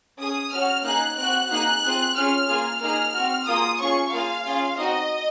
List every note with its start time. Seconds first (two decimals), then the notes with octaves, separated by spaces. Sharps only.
0.19 C#4 G#4 D#6
0.51 C#4 F#4 F6
0.84 A#3 D#4 G#4 F#6
1.18 C4 F#4 F#6
1.50 A#3 D#4 G#4 F#6
1.83 C4 F4 G#4
2.15 C#4 F4 G#4 F6
2.48 A#3 F4 G#4
2.81 A#3 D#4 G#4 F6
3.14 C4 F#4
3.47 A#3 F4 G#4 D#6
3.79 C#4 F4 G#4 C#6
4.12 A#3 F4 G#4 F5
4.46 C#4 F4 G#4
4.77 C4 D#4 F#4 D#5